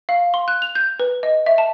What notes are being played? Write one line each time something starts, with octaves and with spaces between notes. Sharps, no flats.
F5
C6
F#6
F7
G6
B4
D#5
E5
A5